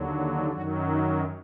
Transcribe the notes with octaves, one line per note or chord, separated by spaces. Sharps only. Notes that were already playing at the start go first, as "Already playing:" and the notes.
Already playing: D#2 D3 F#3
F#2 D#3 F#3 F#4
D#4